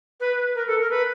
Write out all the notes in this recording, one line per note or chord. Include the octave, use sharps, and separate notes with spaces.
B4
A#4
A4
A#4
B4